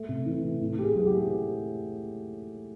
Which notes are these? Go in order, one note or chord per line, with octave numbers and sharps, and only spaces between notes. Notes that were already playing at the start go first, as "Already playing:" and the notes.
Already playing: A3
C3
E3
C3
A2
A2 G4
G#4
F#3 G#4
G4
A3